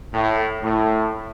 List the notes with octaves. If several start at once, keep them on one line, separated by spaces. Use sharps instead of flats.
A2
A2